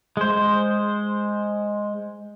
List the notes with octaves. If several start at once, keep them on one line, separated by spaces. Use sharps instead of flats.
G#3 C5